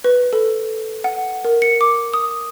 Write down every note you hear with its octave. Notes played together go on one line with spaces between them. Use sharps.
B4
A4
F#5
A#4
C#7
D6
D#6